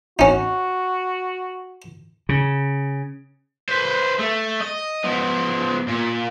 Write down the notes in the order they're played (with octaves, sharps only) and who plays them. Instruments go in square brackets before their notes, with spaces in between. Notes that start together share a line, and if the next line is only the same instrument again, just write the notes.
[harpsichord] C#4 D#4 [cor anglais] F#4
[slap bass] C#3
[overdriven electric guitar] B4 C5
A3
D#5
F3 B3
A#2